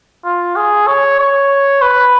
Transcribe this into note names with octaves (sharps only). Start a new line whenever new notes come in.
F4
G#4
C#5
C#5
B4